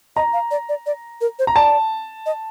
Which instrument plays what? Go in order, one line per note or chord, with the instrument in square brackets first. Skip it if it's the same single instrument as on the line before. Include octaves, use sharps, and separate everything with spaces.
[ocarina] D#5 [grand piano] A#5
[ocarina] F5
D5
D5
D5
A#4
C5
[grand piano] A#5
[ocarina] D5 [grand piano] A5
[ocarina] D#5